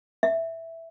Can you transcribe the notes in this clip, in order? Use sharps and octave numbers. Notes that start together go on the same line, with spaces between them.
E5